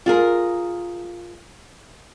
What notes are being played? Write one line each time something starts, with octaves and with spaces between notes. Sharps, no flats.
F4 G#4 A#4